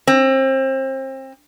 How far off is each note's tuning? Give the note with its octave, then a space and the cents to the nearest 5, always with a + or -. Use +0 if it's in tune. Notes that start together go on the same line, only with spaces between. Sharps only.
C4 +30